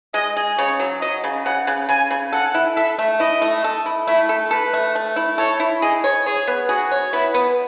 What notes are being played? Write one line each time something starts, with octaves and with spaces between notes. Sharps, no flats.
G#3 D#5
G#4
C#3 C#5
F#3
F#3 D#5
C#3
C#3 F#5
C#3
C#3 G#5
C#3
A4 F#5
E4
A4 E5
A3
E4 D#5
A3
A4
E4
A3 E4
A4
A4 B4
A3
A3
E4
A4 C#5
E4
G#4 D#5
C#5
G#4 C#5
B3
F#4 G#4
C#5
B3 E4
B3